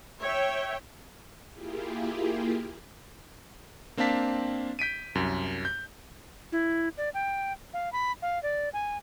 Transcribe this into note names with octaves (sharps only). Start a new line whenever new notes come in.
C#5 E5 G5
A#3 E4 F4 G4 G#4
A#3 C4 D4 F5 A5 B6
G6 B6 D7 D#7
C2 F#2
G6
E4
D5
G5
F5
B5
F5
D5
G#5